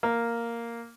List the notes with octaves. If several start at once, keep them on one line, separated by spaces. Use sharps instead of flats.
A#3